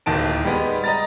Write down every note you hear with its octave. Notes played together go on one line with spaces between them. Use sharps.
D1 D#2 D#3 A5 D7
G3 G#3 B3
D#5 A#5 A6